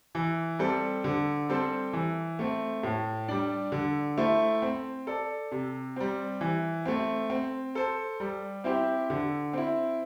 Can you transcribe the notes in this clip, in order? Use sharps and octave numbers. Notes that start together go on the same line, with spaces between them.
E3
G3 C4 A4
D3
G3 C4 A4 C5
E3
A3 C4
A2
G3 D4
D3
A3 E4 C5
C4
A4 D5
C3
G3 C4
E3
A3 C4
C4
A4 C5
G3
C4 E4 G4 C5
D3
C4 E4